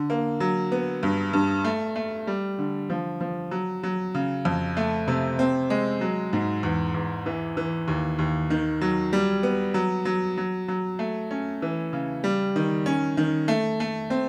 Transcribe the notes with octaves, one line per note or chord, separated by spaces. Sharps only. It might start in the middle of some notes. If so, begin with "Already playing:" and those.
Already playing: D3
A#3
F#3
B3
G2
G2
A3
A3
G3
D3
F3
F3
F#3
F#3
C#3
F2
A3
C3
C4
G#3
F#3
G#2
E2
E2
E3
E3
D#2
D#2
D#3
F#3
G3
B3
F#3
F#3
F#3
F#3
A3
C#4
E3
C#3
G3
D#3
C#4
D#3
A3
A3
C4